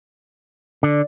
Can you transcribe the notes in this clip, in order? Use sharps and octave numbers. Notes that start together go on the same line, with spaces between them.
D3 D5